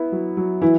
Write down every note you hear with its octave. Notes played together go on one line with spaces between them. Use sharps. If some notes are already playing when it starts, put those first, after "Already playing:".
Already playing: B3 E4
F#3
F#3
E3 E4